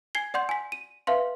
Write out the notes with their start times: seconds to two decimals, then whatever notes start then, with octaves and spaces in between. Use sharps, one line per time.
0.15 G#5 G#6 C7 G7
0.34 D5 F#5 C6 G6
0.49 G#5 B6
0.72 D#7
1.07 B4 E5 F5 C6